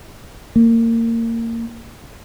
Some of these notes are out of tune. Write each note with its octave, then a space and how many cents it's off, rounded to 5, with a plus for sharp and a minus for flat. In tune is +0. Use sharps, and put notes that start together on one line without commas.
A#3 -25